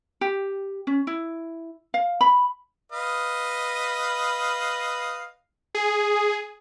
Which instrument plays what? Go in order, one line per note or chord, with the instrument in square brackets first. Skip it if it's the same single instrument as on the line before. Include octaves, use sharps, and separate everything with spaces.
[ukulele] G4
C#4
E4
F5
B5
[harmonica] B4 D#5 F5
[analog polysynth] G#4